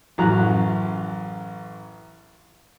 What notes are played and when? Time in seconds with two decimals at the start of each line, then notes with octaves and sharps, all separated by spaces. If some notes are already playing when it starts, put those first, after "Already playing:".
0.18 A1 F#2 A#5 F#6